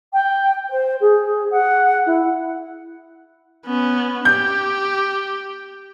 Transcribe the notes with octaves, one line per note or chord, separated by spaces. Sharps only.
G5
C5
G#4
F#5
E4
B3 C#4
G4 G6